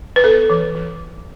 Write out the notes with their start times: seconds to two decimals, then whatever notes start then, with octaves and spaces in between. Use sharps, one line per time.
0.16 B4
0.24 B3 A4
0.50 E3
0.75 E3